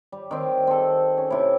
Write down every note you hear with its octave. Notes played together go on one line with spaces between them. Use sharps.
G3
D#3 C4
C4 A4
C#4
C3 E4